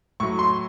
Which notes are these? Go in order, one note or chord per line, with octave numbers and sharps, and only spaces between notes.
A2 F#3 C#6
C6